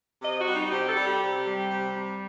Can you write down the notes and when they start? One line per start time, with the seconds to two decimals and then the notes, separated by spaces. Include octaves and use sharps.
0.22 C3 D#5
0.39 F#4
0.47 G3
0.55 D#4
0.71 C3 G4
0.88 A4
0.97 G3
1.05 G4
1.22 C3
1.45 G3
1.70 C3
1.96 G3